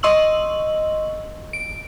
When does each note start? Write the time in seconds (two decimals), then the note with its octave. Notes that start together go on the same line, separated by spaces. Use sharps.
0.03 D#5 C6 C#6 E6 F#7
1.53 D7